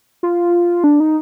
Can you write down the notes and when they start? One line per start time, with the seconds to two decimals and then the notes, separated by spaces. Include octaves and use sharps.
0.23 F4
0.84 D4
1.00 D#4